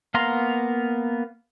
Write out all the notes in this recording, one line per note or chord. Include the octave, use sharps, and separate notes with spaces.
A#3 B3 F5 A#5 C6